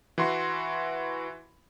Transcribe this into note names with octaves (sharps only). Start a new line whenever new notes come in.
E3 F#4 C6